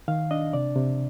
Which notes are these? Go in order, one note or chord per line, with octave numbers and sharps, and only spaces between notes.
D#3 F5
D4 D#5
C3 D5
C3